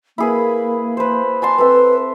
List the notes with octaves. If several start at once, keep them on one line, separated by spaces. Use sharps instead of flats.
A#3 E4 G#4 B4
B4 C5
G#5 A5 C6
C4 A4 B4 E5